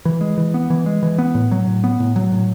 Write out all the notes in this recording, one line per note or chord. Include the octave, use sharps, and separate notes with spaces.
E3
G#3
E3
B3
E3
G#3
E3
B3
A2
F#3
A2
B3
A2
F#3
A2